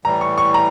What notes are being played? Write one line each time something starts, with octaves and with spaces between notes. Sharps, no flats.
A2 E3 G3 A#5
C#6
C#6
A#5